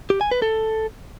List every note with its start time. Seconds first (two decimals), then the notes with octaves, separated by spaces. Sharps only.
0.10 G4
0.21 G#5
0.31 B4
0.42 A4